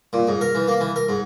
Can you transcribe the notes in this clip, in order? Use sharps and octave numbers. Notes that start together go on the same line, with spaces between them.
A#2
G#2
A#4
E3
A#3
E3
A#4
G#2